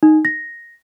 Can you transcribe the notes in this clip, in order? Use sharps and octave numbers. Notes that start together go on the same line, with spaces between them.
D#4
A#6